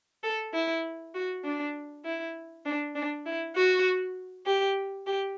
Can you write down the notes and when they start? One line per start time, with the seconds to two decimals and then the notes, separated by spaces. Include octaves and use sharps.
0.23 A4
0.53 E4
1.14 F#4
1.45 D4
2.05 E4
2.65 D4
2.95 D4
3.26 E4
3.56 F#4
4.46 G4
5.07 G4